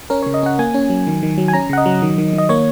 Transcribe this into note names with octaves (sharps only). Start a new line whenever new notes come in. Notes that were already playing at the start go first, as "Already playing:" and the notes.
C#4 A#4
C#3 C#5
D#5
C#4 F#5
A#3 G#5
C#4
F#3
D#3
D#3
F#3
G#5
C#4 A#5
C#3 F#5
D#5
F#3
D#3
D#3
D#3
D#5
A#3 C#5